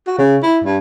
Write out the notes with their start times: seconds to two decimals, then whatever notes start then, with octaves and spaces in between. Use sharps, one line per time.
0.07 F#4
0.18 C#3
0.43 E4
0.63 G2